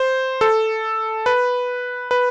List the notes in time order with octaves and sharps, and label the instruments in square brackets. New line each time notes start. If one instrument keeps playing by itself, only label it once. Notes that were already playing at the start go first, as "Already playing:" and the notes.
Already playing: [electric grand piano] C5
A4
B4
B4